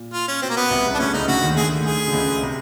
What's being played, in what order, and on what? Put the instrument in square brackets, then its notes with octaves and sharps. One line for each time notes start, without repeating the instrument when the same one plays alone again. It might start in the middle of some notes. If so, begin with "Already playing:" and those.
Already playing: [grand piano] A#2
[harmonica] F4
C#4
[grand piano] B2 [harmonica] C4
[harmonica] A#3
B3
[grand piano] C2 C3
C#2 C#3
[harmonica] D4
[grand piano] D2 D3 [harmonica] C#4
[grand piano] C#2 C#3 [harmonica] D#4
[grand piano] D2 D3 [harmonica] F#4
[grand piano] D#2 D#3
[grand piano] D2 D3 [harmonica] G#4
[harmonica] G#4
[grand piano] D3
C#2 C#3
C3